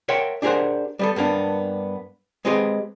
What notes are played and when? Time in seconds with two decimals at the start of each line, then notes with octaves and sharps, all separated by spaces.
0.08 A#4 C#5 E5 F#5 G5 C6
0.42 D4 G4 G#4 A#4 C5 F#5
0.99 G3 B3 A4
1.16 G2 A#3 B3 D4
2.45 G#3 C4 G4 B4 D#5